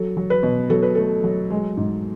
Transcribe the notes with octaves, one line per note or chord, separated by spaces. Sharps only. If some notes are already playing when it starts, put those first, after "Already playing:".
Already playing: F#3 A4
F#3
B4
B2
F#3 A4
B4
A3 A4
F#3
G#3
G#2